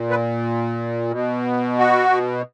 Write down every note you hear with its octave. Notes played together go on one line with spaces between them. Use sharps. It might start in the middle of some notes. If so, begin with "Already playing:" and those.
Already playing: A#2
B4
B2
F#4